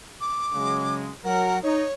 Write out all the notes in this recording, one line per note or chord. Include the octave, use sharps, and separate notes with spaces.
D6
C#3 F#3 G#3
F#3 A#4 F#5
D#4 C#5